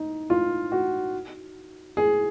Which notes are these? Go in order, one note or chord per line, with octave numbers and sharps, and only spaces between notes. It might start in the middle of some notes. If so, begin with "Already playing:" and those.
Already playing: D#4
F4
F#4
G#4